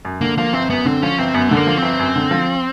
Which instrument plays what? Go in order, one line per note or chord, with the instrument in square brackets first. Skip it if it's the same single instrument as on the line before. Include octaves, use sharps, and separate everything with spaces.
[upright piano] F#2
[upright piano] D3 [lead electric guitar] A#3
[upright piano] F3 [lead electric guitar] A#3
[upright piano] G1 [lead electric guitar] C4
[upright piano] F#2 [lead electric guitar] B3
[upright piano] D3 [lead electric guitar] C4
[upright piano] F3 [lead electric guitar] C#4
[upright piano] G1 [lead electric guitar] C4
[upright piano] F#2 [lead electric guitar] B3
[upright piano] D3 [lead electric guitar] A3
[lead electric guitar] A#3
[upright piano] F3
[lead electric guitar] C4
[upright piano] G1
F#2
D3
F3